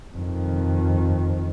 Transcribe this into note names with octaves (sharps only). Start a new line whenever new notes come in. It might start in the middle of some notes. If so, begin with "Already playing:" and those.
F2 D#3